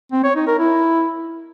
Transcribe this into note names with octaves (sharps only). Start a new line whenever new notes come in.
C4
C#5
D#4
A#4
E4